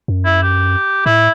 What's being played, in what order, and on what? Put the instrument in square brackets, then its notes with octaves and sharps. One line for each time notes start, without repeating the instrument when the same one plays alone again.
[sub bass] F#2
[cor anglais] E4
G4
[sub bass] A2 [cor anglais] E4